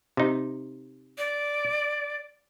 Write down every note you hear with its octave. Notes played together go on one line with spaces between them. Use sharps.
C3 D#4
D5